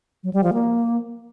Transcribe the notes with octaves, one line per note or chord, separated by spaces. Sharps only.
F#3
G3
F3
A#3